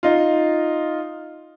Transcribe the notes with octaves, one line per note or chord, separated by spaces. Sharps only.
D#4 F4